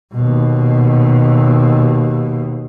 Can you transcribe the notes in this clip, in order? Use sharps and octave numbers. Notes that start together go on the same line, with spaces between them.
D#2 B2